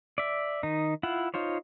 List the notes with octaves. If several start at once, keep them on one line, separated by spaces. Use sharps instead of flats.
D5 E5
D#3 D#4
E4 F4 F#5
D#4 F4 C5 C#5